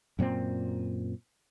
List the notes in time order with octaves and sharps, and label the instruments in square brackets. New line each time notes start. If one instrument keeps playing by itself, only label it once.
[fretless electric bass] F#2 A#2 B3 C4